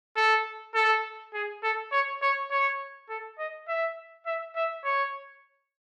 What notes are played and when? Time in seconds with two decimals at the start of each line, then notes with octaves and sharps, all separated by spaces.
0.16 A4
0.74 A4
1.34 G#4
1.63 A4
1.92 C#5
2.22 C#5
2.51 C#5
3.09 A4
3.38 D#5
3.68 E5
4.26 E5
4.55 E5
4.85 C#5